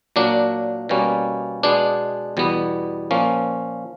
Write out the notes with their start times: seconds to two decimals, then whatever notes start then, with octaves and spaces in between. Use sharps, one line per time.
0.16 A#2 F#3 A#3 D4
0.89 B2 G3 A#3 C#4
1.63 B2 G#3 B3 D4
2.37 E2 B2 G3 B3
3.11 A#2 F3 A#3 C#4